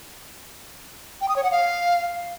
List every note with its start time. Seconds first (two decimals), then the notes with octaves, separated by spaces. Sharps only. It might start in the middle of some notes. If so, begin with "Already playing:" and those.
1.21 G5
1.29 D#6
1.36 C#5
1.44 F#5
1.51 F5